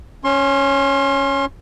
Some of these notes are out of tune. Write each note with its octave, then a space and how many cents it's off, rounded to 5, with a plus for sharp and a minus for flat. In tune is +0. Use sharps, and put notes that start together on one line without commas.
C#4 +0 C6 +35